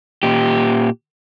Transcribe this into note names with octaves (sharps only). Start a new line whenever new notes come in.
A#2 G4